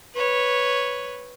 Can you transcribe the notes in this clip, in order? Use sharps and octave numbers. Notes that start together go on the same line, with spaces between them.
B4 C#5